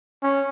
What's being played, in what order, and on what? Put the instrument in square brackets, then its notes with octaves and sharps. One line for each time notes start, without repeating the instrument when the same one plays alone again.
[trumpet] C#4